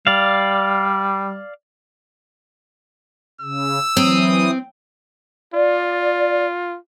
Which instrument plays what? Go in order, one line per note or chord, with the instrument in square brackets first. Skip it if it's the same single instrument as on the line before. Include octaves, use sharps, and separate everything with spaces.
[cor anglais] G3 [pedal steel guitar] D5 F5
[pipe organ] C#3 [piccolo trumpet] E6
[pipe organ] E3 D#6 [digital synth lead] F#3 [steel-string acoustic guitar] C4
[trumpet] F4 [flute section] D5